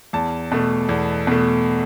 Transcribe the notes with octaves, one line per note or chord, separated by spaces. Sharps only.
E2 A5
B2 A3
E2
B2 A3